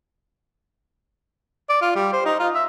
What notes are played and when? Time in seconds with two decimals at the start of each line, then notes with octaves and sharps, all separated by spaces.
1.69 D5
1.82 F4
1.96 G3
2.13 C5
2.25 D#4
2.39 F4
2.55 E5